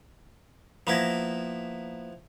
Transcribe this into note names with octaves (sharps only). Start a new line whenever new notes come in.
F3 A#3 B3 E4 A#5